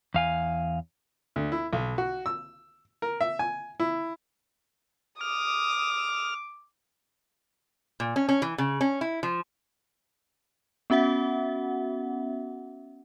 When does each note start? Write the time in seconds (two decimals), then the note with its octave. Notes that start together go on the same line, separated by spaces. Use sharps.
0.14 E2 F5 G#5
1.36 D2
1.52 E4
1.73 B1
1.98 F#4
2.26 E6
3.02 A#4
3.21 E5
3.39 G#5
3.80 E4
5.21 D6 D#6 F6
8.00 A#2
8.16 C#4
8.29 C#4
8.42 E3
8.58 C#3
8.81 C#4
9.01 E4
9.23 F3
10.90 B3 C#4 F#4 E5 F#5